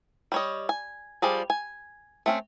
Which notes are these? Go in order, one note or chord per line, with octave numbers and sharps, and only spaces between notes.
G3 C#5 D#5
G#5
F3 G3 G#4 D5
G#5
A3 C4 C#4